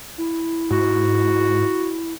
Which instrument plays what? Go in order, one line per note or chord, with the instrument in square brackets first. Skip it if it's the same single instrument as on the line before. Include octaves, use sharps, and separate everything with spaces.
[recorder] E4
[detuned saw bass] G#2 [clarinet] F#4